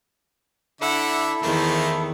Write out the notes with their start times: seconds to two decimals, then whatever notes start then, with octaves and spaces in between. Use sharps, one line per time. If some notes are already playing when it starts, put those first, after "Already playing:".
0.81 D3 E4 A4 E5 F#5 D6
1.42 E2 D#3 A3 A#3 C5 E5